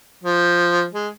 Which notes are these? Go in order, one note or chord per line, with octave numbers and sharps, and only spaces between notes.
F3
G#3